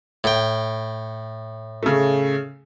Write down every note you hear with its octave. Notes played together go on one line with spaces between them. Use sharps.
A2 G5
C#3 A3